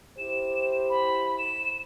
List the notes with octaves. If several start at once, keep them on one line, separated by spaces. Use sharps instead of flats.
E4 G4 C5 E7
B5
E7